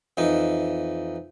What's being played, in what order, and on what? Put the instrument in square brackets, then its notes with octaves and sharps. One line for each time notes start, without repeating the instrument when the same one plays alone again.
[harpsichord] F2 E3 D#4